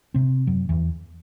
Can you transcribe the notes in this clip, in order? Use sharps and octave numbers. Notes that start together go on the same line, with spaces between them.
C3 C4
F#2 F#3
E2 E3